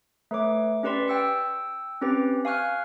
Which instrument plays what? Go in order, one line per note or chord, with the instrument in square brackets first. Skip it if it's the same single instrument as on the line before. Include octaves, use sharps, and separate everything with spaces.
[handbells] A3 B4 C#5 D6
C#4 G4 B4 D5 C6 B6
G5 E6 C#7
C4 C#4 G4 B4 G5
F5 G#5 C#6 F6 F#6